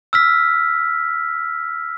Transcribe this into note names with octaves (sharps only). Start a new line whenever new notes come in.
E6 F6 B6